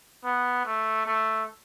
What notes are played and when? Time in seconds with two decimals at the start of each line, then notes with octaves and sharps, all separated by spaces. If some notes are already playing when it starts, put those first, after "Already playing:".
0.24 B3
0.65 A3
1.06 A3